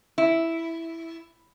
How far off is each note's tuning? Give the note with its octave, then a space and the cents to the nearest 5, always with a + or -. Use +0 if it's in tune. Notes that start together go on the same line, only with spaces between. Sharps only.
E4 +0